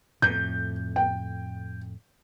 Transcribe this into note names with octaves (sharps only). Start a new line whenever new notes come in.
F2 A2 G6
G5